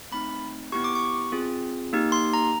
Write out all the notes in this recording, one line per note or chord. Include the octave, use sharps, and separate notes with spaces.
A3 C4 D#4 B5
B3 E4 G4 C#6
D6
C#6
C4 F4 G#4
A#3 D#4 G4
C6
A#5